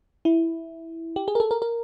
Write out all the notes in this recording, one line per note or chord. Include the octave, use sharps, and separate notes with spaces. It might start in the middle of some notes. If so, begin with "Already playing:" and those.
E4
G4
G#4
A#4
A4
A#4
A#4